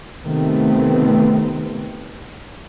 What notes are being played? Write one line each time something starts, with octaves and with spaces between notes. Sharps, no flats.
C3 D#3 A3 B3 C4